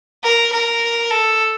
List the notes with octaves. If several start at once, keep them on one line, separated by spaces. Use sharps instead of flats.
A#4
A#4
A4